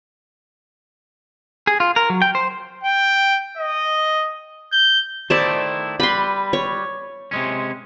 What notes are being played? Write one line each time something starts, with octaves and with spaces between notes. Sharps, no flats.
G#4
F4
A#4
F#3
G5
C5
G5
D#5
G6
D#3 A3 E4 C5 D5 A5
G3 B4 B5 C6
C#5
C3 G#3 C#4